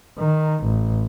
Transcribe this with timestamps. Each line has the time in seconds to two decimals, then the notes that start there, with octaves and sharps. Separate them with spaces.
0.19 D#3
0.64 A1